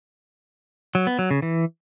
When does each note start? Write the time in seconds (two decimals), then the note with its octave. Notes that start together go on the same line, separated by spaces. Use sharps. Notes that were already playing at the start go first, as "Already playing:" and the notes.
0.95 F#3
1.07 B3
1.19 F#3
1.31 C#3
1.42 E3